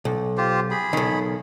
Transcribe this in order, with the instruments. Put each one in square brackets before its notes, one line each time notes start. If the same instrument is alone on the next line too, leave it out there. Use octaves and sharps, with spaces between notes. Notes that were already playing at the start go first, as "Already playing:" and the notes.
[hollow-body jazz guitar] B1
[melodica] F4 G4 C5
G#4 B5
[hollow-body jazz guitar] B1 D#3